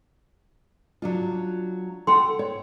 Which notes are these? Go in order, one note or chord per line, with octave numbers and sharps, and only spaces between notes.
F#3 D4 F4
A4 F#5 G5 B5 C6
C#5